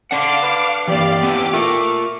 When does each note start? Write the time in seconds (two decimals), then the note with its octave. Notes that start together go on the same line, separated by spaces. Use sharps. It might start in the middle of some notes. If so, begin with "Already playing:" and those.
0.11 D4 F5 F#5 D6
0.43 B4
0.88 E3 A#3 G4 D5 F5
1.23 B3 D4 E4 D6
1.53 A3 F4 A#4